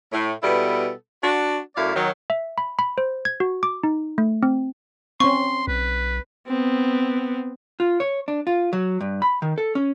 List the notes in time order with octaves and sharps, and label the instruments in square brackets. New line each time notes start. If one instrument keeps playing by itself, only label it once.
[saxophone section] A2
B2 G3 B3 E4 A4
D4 F#4
F#2 A3 E4 D5 F5
D#3 F#3
[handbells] E5
B5
B5
C5
G#6
F#4
D6
D#4
A3
C4
[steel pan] C4 C#4 [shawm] C6 [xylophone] C#6
[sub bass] B1 [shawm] B4
[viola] B3 C4
[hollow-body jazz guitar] F4
C#5
D4
F4
F#3
G2
B5
D#3
A4
C#4